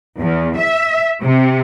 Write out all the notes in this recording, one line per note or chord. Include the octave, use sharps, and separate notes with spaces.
E2
E5
C3